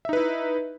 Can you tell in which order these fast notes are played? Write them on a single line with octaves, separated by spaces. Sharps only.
E5 D#4 B4 E4